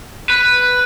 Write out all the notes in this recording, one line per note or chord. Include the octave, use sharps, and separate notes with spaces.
B4